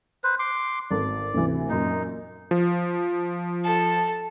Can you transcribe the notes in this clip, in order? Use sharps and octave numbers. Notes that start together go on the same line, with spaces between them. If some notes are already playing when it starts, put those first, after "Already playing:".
B4 C5
C6 D6
G#1 A4 D5
D2 C3 E3
F#2 A#2 D#4
F3
A4 A5